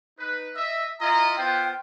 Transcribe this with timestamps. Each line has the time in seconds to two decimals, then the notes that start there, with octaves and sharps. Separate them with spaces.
0.18 D#4 B4
0.55 D#5 E5
1.01 E4 F4 D#5 A#5
1.38 B3 F4 C5 G5